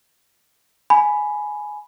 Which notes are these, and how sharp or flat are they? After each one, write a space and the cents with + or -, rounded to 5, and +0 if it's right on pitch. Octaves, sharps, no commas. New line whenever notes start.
G#5 +10 B5 +0